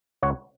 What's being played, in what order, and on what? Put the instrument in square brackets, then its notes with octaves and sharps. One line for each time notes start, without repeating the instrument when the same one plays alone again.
[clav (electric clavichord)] C#2 C#5 F#5